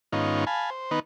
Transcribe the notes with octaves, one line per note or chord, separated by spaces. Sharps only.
G#2 D#3 B3 C#4 D#4 F4
F5 G#5 A5 B5
C5
D#3 B3 D#4 B4